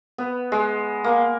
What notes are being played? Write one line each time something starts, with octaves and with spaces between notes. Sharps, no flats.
B3
G#3
A#3